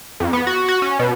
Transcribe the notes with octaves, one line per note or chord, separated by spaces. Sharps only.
F2
B3
F#4
F#4
C#4
B2